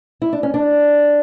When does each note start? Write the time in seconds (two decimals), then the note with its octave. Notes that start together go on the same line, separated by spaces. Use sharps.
0.22 E4
0.33 D4
0.43 C#4
0.54 D4